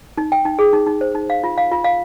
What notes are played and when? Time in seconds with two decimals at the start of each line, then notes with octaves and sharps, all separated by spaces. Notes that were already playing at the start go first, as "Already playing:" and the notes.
0.18 D#4
0.32 G5
0.45 D#4
0.59 G#4
0.73 D#4
0.87 D#4
1.01 C5
1.15 D#4
1.30 F5
1.44 F4
1.58 F5
1.71 F4
1.84 F5